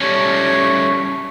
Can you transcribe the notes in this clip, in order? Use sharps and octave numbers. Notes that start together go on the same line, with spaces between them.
G3 A3 C#4 C#5